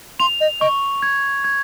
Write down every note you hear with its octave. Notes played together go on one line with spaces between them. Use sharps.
C6 F7
D#5
D#5 C#6
G#6
G#6